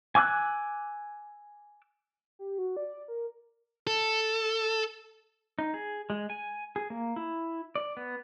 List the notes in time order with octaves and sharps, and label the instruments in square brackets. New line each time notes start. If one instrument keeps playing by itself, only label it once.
[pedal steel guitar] G#5 D6 E6 F#6
[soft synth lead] G4
F#4
D5
A#4
[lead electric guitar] A4
[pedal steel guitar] D#4
G#4
G#3
G#5
G#4
A#3
E4
D5
B3